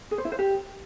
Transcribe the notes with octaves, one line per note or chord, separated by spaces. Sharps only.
G#4
C5
E4
C5
G4